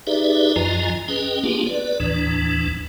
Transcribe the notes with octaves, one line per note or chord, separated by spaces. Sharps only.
D#4 G4 G#4 B4 D5 E5
F#2 F3 F4 D#5 G#5 A#5
C#4 G#4 B4 D#5 G5
A#3 B3 D4 F4 G4 G#4
B4 D5
D#2 A2 E3 D4